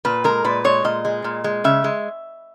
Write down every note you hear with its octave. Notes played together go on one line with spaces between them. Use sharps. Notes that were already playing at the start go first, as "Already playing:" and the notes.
A#2 B4
G#3 A#4
A#2 B4
G#3 C#5
A#2 D#5
G#3
A#2
G#3
C#3 E5
G#3